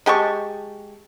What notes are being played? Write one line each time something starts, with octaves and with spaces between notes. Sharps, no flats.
G#3 G4 A5 C#6